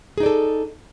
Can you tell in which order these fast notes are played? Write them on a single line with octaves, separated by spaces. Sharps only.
G#4 D#4 D5 A4